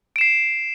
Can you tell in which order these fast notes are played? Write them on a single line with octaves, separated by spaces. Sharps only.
D7 E7 C7